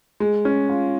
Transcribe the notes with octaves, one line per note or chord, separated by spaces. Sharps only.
G#3
C#4
F4